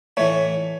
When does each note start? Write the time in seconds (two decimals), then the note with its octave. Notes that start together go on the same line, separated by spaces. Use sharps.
0.17 A2 E3 A3 C#5